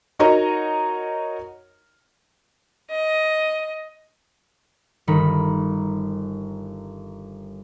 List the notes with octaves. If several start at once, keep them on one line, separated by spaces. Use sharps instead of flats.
D#4 F#4 A#4 C#5 D#5 A#5
D#5
G1 D#3 B5